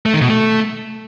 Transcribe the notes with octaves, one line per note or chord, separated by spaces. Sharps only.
A3
D#3
B2
A3